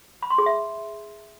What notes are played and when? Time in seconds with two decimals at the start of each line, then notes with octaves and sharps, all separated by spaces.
0.23 B5
0.30 C6
0.38 G#4
0.46 E5